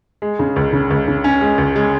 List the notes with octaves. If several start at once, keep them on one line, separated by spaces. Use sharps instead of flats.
G#3
C#3
C#2
C#3
C#2
C#3
C#4
G#3
C#2
G#3